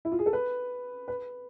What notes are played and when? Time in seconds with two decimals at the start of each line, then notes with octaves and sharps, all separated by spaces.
0.05 E4
0.12 F4
0.19 G#4
0.26 A4
0.33 B4
1.08 B4